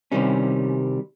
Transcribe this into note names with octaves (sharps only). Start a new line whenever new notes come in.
C2 C3 D#3 G3 C#4